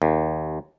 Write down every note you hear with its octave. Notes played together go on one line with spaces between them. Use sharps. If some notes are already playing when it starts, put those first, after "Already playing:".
D#2